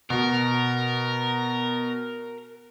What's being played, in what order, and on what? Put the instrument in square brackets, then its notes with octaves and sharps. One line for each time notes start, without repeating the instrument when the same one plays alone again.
[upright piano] B2 [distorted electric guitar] A#4